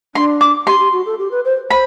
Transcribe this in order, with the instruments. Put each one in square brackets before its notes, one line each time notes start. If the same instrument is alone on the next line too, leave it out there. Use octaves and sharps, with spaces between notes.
[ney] D4 [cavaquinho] C6
[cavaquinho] D6
[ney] G4 [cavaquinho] C6
[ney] G4
F#4
A4
G4
B4
C5
[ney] C5 [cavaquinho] B5